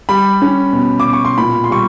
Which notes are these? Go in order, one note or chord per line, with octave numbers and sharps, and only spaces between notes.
G3 B5
C#4
B2
D6
B2
C#6
C6
A#2 B5
C6
G3 C#6